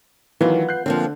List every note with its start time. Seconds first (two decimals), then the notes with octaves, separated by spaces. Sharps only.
0.41 D#3 E3 F#3 B3 F4
0.69 F#6 G6 C7
0.86 D3 F3 A#3 C4